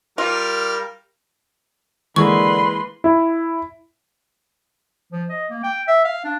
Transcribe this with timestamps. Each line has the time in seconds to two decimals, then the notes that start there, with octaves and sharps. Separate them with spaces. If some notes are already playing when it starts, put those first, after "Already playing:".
0.18 G3 F4 A#4
2.16 D3 E3 G#3 A#3 B4 C6 C#6
3.04 E4
5.12 F3
5.29 D#5
5.50 A#3
5.63 G5
5.88 E5
6.05 F5
6.24 D4